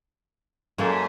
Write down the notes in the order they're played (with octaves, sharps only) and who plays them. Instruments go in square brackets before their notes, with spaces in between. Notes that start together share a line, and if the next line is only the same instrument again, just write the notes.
[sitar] F#2 [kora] G#3 A#3 A4